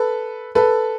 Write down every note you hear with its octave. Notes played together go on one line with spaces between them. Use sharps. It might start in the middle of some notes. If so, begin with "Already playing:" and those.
Already playing: A4 B4
A4 B4